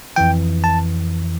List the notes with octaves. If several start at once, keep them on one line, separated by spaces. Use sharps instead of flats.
F2 E3 G5
A5